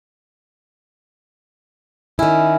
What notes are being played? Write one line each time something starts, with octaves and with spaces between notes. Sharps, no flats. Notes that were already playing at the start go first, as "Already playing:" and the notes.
D#3 C#4 E4